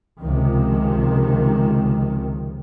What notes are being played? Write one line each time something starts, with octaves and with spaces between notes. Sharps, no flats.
C#2 C3 D#3 F3